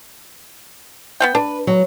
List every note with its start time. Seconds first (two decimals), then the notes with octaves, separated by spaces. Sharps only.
1.20 B3 C4 G5
1.35 D4 B4
1.67 F#3